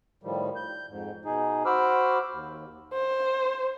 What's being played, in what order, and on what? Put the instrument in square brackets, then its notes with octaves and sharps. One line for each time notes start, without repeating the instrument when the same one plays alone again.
[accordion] A2 D#3 F3 G3
G6
F2 G#2
B2 D#4 G#4
F#4 C5 B5 D6 E6 F6
D#2
[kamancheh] C5